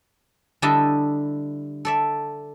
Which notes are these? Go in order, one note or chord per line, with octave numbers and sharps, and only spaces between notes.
D3 G3 E4 G4 D#5 A5
A4 D5 E5